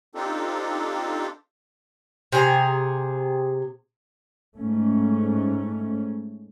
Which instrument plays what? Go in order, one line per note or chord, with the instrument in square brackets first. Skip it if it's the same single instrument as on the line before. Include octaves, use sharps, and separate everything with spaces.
[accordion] C4 D4 D#4 F4 G4 A4
[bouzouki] C3 G#4 A#5
[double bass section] G#2 A3 C#4